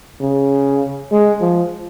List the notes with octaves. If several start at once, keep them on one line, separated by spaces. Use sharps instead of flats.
C#3
G#3
F3